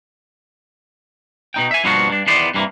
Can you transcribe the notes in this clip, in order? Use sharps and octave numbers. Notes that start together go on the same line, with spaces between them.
B2 D#4 G5
E5 G#5
G2 B2 F3 A#3 F4 F#4
G2 D4
E2 D#3 B3 C5 D5
G2 C3 E3 A#3